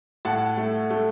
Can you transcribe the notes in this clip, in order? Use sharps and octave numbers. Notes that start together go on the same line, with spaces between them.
A2 F#5 A5
A3
A3